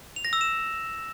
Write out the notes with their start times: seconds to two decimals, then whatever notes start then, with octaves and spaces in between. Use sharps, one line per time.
0.16 F7
0.25 A#6
0.33 E6
0.41 E7